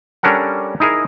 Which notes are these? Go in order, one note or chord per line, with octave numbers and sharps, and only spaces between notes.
G3 C#4 D4 A4 A#4 F#5
D#4 E4 G#4 A#4